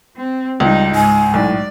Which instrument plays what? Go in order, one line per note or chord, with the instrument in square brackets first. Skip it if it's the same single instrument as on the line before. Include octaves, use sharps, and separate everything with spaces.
[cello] C4
[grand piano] C#2 [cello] G3 D#4
[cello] G#2 [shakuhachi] G#5
[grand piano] B1 A2 [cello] D5